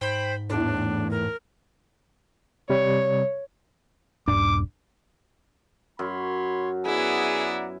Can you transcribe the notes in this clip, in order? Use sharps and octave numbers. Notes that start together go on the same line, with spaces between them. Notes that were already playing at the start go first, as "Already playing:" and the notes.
G#2 C5 G5 B5
E2 A2 D4
A#4
C3 G3 C#5
D#1 G2 D4 D6
F#2 C#5 B5 C6
B3 E4 G#4 D5 F#5 G#5 A#5